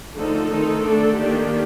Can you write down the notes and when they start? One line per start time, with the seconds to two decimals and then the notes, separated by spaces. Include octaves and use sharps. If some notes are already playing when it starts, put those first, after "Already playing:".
0.15 D3 F3 A3 D#4 A4
0.50 D#3 A3 C4 D#4 A4
0.85 D3 A3 D4 A4
1.20 D#3 A#3 D4 G4